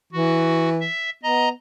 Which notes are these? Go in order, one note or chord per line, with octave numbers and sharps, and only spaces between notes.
E3 F#4
E5
B3 D#5 A#5